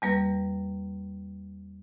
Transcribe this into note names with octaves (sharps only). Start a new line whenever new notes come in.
E2 G3 A#3 B4 A#6